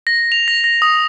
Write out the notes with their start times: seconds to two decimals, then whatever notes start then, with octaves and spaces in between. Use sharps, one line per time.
0.07 A#6
0.32 F7
0.48 A#6
0.64 A#6
0.82 D#6